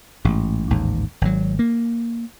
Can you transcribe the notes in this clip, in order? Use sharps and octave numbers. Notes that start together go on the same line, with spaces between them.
A1 G#2
A1 D#2 G#2
G#1 F#3
A#3